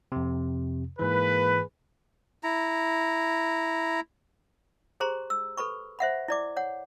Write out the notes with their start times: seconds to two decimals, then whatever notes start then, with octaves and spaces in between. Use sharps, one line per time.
0.12 F2 C3
0.99 G#2 E3 A#3 G#4 B4
2.43 E4 A#5
5.00 G4 G#4 C5 A#5 C6
5.30 E6
5.57 A4 B4 B5 C#6
5.99 C5 E5 F#5 B5
6.28 E4 D5 D6
6.57 C#5 F#5